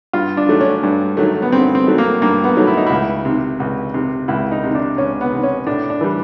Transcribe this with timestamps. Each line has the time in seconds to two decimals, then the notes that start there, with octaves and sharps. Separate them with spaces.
0.13 G2 F4
0.37 D4
0.49 D#3 F#3 A3
0.61 C#4
0.83 G2
1.17 D#3 F#3 A3
1.42 B3
1.52 G2 C4
1.75 C4
1.86 D#3 F#3 A3
1.98 A#3
2.22 G2 A#3
2.44 B3
2.56 D#3 F#3 A3
2.67 E4
2.77 D#4
2.86 C#2 E4
3.25 C3 D#3
3.60 C#2
3.94 C3 D#3
4.28 C#2 E4
4.52 D#4
4.63 C3 D#3
4.75 D4
4.98 C#2 C#4
5.21 B3
5.32 C3 D#3
5.43 C#4
5.66 A2 D4
5.90 D4
6.01 E3 G3